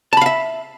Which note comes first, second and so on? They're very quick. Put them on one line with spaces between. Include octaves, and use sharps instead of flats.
A5 B5 F5 E5